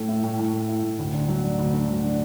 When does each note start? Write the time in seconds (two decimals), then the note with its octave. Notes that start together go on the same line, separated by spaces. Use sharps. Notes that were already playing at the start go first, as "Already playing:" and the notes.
Already playing: A2 A3
0.09 E4
0.24 A2
0.39 A2
0.53 A3
0.69 E4
0.83 A2
0.99 D2
1.14 D3
1.28 F#3
1.44 D4
1.59 D2
1.73 D3
1.89 F#3
2.04 D4